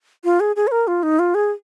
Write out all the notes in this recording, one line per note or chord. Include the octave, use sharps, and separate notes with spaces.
F4
G#4
G#4
C#5
A#4
F4
D#4
F4
G#4